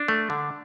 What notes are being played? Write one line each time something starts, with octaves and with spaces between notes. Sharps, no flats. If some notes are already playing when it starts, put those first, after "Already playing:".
Already playing: D4
A3
D3